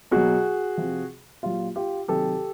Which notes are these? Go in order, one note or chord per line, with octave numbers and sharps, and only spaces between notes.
B2 F#3 F#4 G#4
C3 F3
A#2 F#3 F4 G4
F4 G4
C3 D#3 F#3 G4 A4